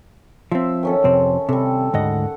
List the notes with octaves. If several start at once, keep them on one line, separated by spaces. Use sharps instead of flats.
F3 C4 E5
D#3 C#4 A4
F2 C3 C4
C3 G3 A4
D2 G#2 D#5 F#5